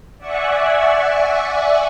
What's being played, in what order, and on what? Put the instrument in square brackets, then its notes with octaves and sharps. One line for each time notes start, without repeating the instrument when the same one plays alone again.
[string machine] D5 E5 F#5 G#5 C#6